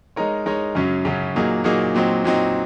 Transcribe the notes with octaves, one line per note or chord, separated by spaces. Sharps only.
G#3 D#4 A#4 C#5
G#3 D#4 A#4 C#5
F#2 C#3 F#3 C#4
F#2 C#3 F#3 C#4
A#2 F#3 A#3 D#4 G#4
A#2 F#3 A#3 D#4 G#4
A#2 F#3 C4 D#4
A#2 F#3 C4 D#4